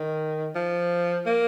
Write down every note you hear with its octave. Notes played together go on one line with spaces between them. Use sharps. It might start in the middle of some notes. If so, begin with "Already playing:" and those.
Already playing: D#3
F3
A#3